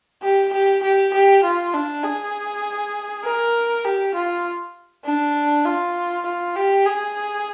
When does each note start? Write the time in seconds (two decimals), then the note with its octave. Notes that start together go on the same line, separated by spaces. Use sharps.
0.23 G4
0.53 G4
0.83 G4
1.13 G4
1.44 F4
1.74 D4
2.03 G#4
3.25 A#4
3.85 G4
4.15 F4
5.05 D4
5.66 F4
6.26 F4
6.56 G4
6.86 G#4